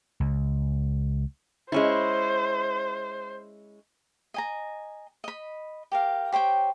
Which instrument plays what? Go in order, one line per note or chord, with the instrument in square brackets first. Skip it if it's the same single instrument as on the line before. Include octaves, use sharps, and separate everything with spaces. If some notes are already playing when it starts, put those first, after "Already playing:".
[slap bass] C#2
[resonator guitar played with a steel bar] G#3 C#4 E4 [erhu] C5
[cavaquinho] D#5 G#5 A#5
D#5 B5
G4 A#4 F5
G4 C5 C#5 G5